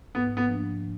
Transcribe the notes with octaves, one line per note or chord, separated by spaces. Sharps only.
G#2 B3
B3
F3 A#3 D4